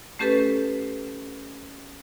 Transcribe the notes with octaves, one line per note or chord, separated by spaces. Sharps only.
A3 C#4 G4 A4 B4